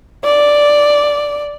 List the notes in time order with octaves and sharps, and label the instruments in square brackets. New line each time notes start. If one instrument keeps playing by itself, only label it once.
[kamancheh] D5